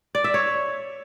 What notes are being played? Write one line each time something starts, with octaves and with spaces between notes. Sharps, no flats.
D5
E5
C#5